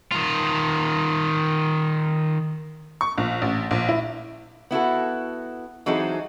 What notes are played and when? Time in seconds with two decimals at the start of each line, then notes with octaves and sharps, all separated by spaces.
0.12 D#3 F4
3.01 C#6
3.18 A#1
3.42 A1
3.71 A#1
3.89 E4
4.71 B3 E4 F#4 A4
5.86 E3 F#3 C4 D#4 G#4 A4